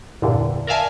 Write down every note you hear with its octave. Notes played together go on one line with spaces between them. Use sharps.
E2 G2 A#2 D3
A#4 D5 E5 F5 G#5 A5